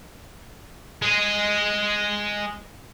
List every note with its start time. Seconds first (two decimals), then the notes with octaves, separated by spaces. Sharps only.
1.02 G#3 G#4